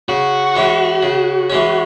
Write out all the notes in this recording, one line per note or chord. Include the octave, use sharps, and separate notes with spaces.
C#3 F#4
E3 G#3 C#4
C#3
E3 G#3 C#4